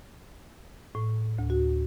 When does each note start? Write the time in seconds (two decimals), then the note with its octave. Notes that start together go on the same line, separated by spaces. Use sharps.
0.95 A2
1.38 D2
1.50 F#4